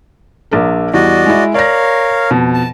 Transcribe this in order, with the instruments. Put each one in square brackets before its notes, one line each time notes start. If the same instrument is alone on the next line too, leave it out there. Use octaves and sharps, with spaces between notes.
[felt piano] A#1 D4 A#4
[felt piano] E2 G3 [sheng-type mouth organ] F#4 D5 D#5
[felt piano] G#3 E4
[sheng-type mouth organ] A#4 C#5 F5 [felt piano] D5 A#6
[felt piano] F2 B2
[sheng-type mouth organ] A5